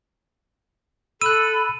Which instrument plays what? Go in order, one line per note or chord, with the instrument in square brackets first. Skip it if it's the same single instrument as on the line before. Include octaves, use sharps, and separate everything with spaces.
[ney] A4 [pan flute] B5 [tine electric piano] E6 F#6 [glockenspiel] D#7